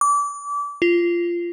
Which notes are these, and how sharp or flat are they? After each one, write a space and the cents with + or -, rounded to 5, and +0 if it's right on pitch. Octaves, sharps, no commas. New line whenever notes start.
D6 -30
F4 -15